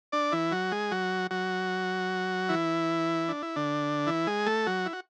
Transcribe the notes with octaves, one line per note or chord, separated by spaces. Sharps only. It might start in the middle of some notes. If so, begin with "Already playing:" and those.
D4 D5
E3 E4
F#3 F#4
G#3 G#4
F#3 F#4
F#3 F#4
E3 E4
D4
E4
D3 D4
E3 E4
G#3 G#4
A3 A4
F#3 F#4
E4
F#4